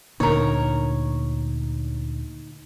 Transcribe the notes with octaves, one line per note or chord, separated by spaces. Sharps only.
D2 A#2 D3 D#4 A#4 C#5